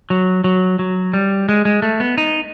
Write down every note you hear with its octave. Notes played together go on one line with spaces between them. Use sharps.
F#3
F#3
F#3
G3
G#3
G#3
A3
B3
D#4